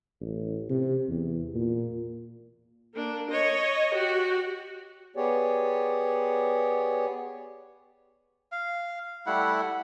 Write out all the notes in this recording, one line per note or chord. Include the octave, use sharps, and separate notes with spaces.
A1
C3
E2
A#2
A#3 D4
C#5 D#5
F#4 G4
B3 G4 G#4 C#5 D5
F5
G3 A3 E4 F#5